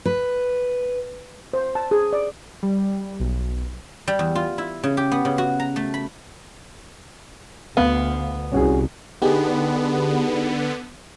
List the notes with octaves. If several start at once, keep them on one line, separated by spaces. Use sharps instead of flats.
B4
C5
A5
G#4
D5
G3
B1
G3
E2
F4
E4
C#3
G4
B3
C#3
F#4
A#5
A3
B5
D2 B3 F5
C2 C#4 F#4 G#4
D3 B3 D#4 G4 G#4